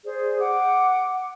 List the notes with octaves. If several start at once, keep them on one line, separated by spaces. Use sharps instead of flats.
G#4 C5 D5
F#5 D6